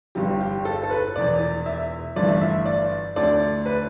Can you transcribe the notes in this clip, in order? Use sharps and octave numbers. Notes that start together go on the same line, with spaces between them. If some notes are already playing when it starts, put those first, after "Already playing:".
G1 G2 G3 G4
G4
A4
A4
B4
E1 E2 E3 D5
E5
G1 G2 E3 A3 D5
E5
E5
D5
D2 D3 A3 D5
B4